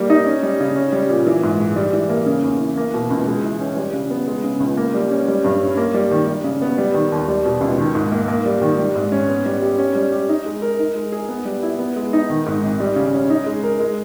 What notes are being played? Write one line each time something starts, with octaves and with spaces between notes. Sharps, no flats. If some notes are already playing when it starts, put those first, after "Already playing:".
Already playing: G3 A#3
D#4
C#4
G3
C#3
C#4
G3
A#2
E3
G#2
G#3
G3
E3
A#3
C#3
E2
E3
A#3
B2
C#2
G#3
E3
C#4
G3
C#3
B3
G#3
C#3
C#2
A#3
G3
C#4
G3
G2
C#4
A#3
G3
D#3
G3
C#3
B3
G3
D#3
D#2
G3
B2
C#2
D#3
G#2
A#3
A#3
G3
D#3
G3
G#2
C#4
B3
G3
G4
C#4
G3
G4
D#4
G#3
A#4
D#4
G#3
G#4
B3
G3
E4
B3
G#3
D#4
D#3
G#2
G#1
G3
C#3
C#4
D#4
G#3
A#4
G#3